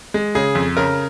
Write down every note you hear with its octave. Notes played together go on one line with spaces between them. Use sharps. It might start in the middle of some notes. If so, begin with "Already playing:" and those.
G#3
C#3 G#4
F2
C#3 A#4